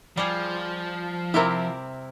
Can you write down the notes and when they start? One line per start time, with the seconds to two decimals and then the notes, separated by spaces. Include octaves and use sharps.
0.17 F3 G3 G#4
1.34 C3 C4 E4 G4 A#4